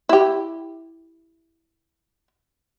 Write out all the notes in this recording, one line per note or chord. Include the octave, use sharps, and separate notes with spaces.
E4 G4